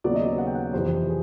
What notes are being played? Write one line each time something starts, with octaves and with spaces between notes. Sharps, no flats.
D#2 C#3 F#3 B3 D5
D#5
F#5
G5
F#5
F2 C3 E3 C5
G#4